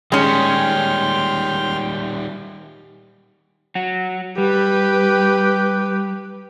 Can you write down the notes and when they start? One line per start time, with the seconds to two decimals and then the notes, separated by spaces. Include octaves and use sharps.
0.12 D#3 G3 G#3 C#4 G5 C6 F6
3.75 F#3 F#4
4.38 G3 G4 B4